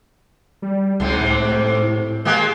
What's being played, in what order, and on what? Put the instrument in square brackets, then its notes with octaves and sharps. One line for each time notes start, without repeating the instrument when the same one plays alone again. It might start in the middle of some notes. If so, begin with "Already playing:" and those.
[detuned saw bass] G3
[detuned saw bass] C#2 [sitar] G#2 C3 C4
[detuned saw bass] A2
[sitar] G#3 A#3 G4